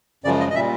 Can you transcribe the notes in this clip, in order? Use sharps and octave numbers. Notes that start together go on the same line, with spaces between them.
F#2 C#3 F3 G#3 D5
D#5
D#5
A#2 G3 E5